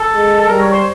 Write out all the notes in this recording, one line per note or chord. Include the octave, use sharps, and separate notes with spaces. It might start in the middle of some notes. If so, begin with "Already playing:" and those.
Already playing: A4
G#3
A4
G3 A#4
C#5
C5